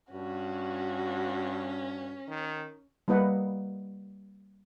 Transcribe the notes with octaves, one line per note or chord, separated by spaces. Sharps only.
G2 C#4 F#4
D#3
G3 A#3 E4 B4 D#5 F#5